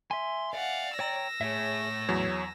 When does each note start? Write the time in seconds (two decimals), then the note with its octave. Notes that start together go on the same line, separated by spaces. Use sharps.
0.11 E5 G#5 C6
0.54 D5 F5 F#5
0.99 C#5 G5 A#5 E6 A#6
1.41 A2 G#4 C#5 E5
2.09 E2 F#3 C#5